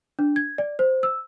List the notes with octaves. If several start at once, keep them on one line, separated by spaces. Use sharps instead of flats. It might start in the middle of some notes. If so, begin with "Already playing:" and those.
D4
G#6
D5
C5
E6